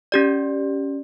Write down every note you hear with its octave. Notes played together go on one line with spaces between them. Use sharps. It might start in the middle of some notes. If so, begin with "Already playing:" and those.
C#4 G4 D5